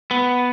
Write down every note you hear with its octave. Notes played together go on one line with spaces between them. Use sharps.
B3